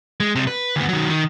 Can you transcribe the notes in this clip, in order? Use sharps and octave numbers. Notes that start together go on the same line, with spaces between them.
G#3
C3 G3
B4
D2 B3
D#3 F#3
D#3